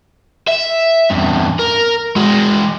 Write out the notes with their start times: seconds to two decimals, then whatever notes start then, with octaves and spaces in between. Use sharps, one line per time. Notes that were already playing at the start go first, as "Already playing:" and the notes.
0.48 E5
1.10 E2 G2
1.59 A#4
2.16 G#3 F#4